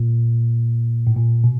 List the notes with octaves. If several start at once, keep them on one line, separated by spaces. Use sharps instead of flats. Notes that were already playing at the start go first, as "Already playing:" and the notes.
Already playing: A#2
A2
A#2
B2